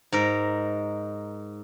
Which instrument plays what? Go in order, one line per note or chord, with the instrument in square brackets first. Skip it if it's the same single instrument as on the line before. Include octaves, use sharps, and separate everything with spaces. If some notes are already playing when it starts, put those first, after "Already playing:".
[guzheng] G#2 A#4